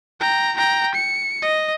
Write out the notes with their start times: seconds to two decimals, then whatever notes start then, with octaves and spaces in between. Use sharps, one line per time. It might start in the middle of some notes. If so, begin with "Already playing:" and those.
0.20 G5 A#5
0.57 G5 A#5
0.95 C#7
1.42 D#5